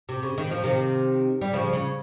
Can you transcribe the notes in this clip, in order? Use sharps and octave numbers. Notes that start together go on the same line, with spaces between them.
C3
C#3
D#3
F3
C3 D#3
G3
C#3 F3
C#3